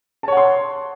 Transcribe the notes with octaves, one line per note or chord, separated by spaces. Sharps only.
C#5 F#5 A5 C6